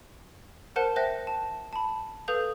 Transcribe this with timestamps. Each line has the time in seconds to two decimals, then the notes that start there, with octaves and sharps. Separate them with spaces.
0.76 A#4 C5 F#5 A5 F#6
0.96 C5 E5 G5 F#6 A#6
1.27 A5
1.73 A5 B5
2.28 A4 B4 F5 D#6 G6 F7